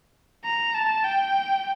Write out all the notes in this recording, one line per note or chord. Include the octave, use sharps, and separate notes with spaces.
A#5
A5
G5